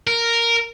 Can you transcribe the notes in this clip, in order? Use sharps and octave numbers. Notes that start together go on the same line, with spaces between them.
A#4